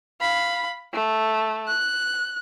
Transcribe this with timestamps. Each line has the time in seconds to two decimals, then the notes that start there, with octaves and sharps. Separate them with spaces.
0.21 F5 B5
0.93 A3
1.68 F#6